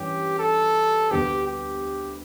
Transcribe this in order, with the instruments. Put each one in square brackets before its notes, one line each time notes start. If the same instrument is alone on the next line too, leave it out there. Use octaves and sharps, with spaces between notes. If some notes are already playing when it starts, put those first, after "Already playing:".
Already playing: [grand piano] G2 E3 G3 C#4 [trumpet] G4
[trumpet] A4
[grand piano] D2 D3 G3 B3 D4 [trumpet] G4
[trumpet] G4